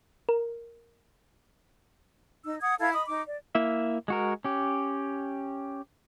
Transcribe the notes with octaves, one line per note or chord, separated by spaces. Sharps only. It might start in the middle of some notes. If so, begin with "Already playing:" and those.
A#4
D#4 E6
F#5 D#6 G#6
E4 A4 F5 G#6
D#5 B5 D#6
D#4 D6
D5
A#3 E4 E5
G#3 F#4 A#4
C#4 G4